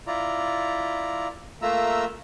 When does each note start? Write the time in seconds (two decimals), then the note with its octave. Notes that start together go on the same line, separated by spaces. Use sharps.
0.07 E4 F4 D5 A#5
1.62 A3 A#3 F4 E5 A#5 E6